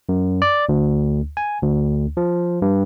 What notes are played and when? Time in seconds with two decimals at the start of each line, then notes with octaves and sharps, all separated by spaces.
0.09 F#2
0.42 D5
0.69 D2
1.37 G#5
1.62 D2
2.17 F3
2.62 G2